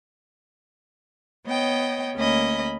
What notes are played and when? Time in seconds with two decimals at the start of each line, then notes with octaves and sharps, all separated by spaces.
1.47 B3 C#5 D#5 G5
2.16 D2 A#3 C#4 D#5 B5